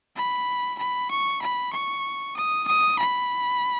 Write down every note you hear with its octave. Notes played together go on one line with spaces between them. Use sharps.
B5
B5
C#6
B5
C#6
D#6
D#6
B5